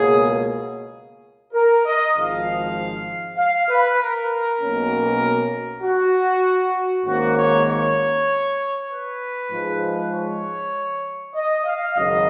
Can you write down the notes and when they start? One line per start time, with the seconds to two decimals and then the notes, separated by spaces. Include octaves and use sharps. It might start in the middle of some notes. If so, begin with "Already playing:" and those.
Already playing: C#2 B2 A#3 C#4 G#4
1.53 A#4
1.85 D#5
2.15 G#1 G#2 F3 F5
3.37 F5
3.69 B4
4.00 A#4
4.60 B1 B2 A#3 C#4
5.83 F#4
7.06 G#1 G#2 D#3 A#3 C#4 F#4
7.36 C#5
7.67 C#5
8.89 B4
9.50 G#2 F3 G#3
10.13 C#5
11.35 D#5
11.65 F5
11.96 G#1 F#2 C#3 F#3 D#5